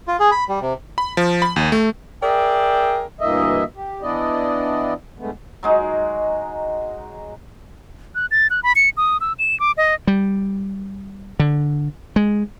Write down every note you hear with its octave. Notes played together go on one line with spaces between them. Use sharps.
F4
G#4
B5
G3
C3
B5
F3
B5
D#2
A3
G#4 A#4 D5 E5 G5
D2 G2 E3 A#3 D#5 E5
G4
E3 B3 D4 E4 D5 D#5
G2 G#3 A3 B3
F#3 G#3 D#4
F#6
A6
F#6
B5
C#7
D#6
E6
E7
D6
D#5
G3
D3
G#3